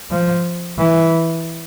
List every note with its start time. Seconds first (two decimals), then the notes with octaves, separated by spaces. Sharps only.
0.11 F3
0.78 E3